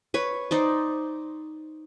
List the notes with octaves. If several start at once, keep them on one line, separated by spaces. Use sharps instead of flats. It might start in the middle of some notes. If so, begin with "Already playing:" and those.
B4 C#5
D#4 C5 D5